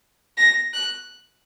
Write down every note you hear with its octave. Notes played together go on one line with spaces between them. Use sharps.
A#6
F#6